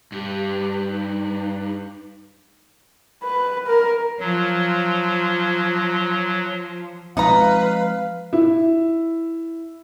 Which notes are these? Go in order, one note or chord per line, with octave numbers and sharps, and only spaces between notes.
G2 G4
D#4
B4
A#4
F3 F#3
F3 G#3 C4 D#4 F4 B4 F5 A#5
E4